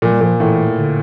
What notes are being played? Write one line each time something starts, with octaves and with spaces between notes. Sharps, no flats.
A#2 F3
G3
A#2 F3
A2 E3
D3